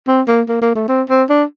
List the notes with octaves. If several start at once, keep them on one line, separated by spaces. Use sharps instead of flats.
C4
A#3
A#3
A#3
A3
C4
C4
D4